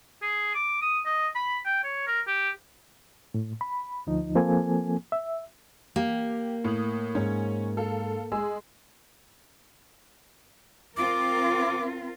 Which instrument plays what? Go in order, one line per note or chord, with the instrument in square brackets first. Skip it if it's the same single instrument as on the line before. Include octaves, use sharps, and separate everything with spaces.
[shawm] G#4
D6
D#6
D#5
B5
G5
C#5
A#4
G4
[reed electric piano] A2
B5
D2 F3 D#4
F3 A#3 C4 A4 G#5
E5
[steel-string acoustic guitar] A#3 [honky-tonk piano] G4
[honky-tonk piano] A2 D#6 F#7
[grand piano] G#2 [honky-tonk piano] C#4
[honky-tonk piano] A4 F5
[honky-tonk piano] G#3 [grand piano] G#4 G#5 E6
[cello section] C4 F4 A#4 [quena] D6